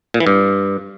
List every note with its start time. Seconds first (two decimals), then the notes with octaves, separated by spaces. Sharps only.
0.14 A#2
0.20 E3
0.27 G2